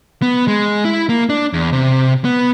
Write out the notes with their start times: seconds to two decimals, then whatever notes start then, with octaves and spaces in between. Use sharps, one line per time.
0.22 B3
0.48 G#3
0.85 E4
1.09 A#3
1.29 D4
1.53 E2
1.73 C3
2.25 B3